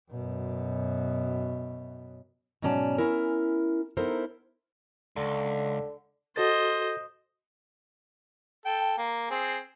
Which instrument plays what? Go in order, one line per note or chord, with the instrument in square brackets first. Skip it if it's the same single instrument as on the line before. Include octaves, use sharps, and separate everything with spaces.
[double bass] F#2 B2
[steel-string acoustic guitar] G#2 B2 F#3 C#4 D5 A5
C#4 E4 A#4
B3 D#4 E4 A4 A#4 C5
[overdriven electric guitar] C#2 [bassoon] D3
[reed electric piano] F#4 A4 A6 [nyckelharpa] C5 D#5
[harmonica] A4 G5
A#3
C4 G#4